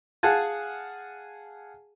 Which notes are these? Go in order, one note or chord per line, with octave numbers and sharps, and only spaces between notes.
G#4 F5 F#5 G#5 A5